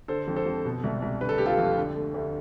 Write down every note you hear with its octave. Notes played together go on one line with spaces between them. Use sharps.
D3 A4 C5
F2
A4 C5
F2
B2
C2
C2
D3 B4
A4
A3 G4
F4 A4
F2
D3
A3
D2